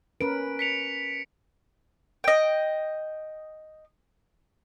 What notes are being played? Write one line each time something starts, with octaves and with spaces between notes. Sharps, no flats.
C#4 A#4 B4 D7
B6 C#7 F7
D#5 G5